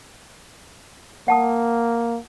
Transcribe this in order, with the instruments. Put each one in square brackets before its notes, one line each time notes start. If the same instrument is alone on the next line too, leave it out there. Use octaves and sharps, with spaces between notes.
[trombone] A#3 [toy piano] F#5 A5 D#6